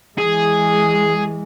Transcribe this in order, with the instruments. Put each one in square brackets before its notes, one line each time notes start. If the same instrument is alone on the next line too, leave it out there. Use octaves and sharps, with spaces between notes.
[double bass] E3 G#3 [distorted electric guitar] G#4